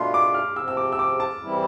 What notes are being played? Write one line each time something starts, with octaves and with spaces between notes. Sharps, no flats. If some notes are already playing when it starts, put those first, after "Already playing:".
Already playing: B2 A3 D4 F4 B5 C6
D6
F6
C3 F3 C4 E6
E6
D6
E6
D6
A5
E3 G3 C4 E4